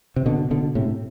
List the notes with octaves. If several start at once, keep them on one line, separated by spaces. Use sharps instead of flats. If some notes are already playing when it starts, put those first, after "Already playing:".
C3
B2 D3
B2 D3
A2 C3